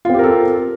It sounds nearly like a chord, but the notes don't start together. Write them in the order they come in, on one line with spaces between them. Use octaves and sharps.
F4 C4 G4 A#4 A4